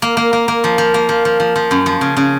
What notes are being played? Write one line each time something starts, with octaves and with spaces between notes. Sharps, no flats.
A#3
A#3
A#3
A#3
F3
F3
A#3
F3
F3
F3
F3
F#2
F3
C#3
C#3